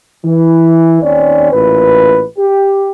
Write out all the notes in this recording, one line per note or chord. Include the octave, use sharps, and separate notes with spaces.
E3
D#2 C4 C#4 D5
A1 A#2 B4
G4